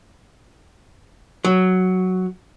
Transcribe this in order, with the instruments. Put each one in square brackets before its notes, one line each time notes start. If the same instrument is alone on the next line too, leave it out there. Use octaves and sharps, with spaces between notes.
[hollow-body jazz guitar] F#3